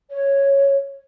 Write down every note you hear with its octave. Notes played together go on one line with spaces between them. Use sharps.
C#5